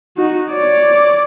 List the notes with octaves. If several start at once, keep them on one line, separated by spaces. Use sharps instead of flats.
D#4 F#4
C#5 D5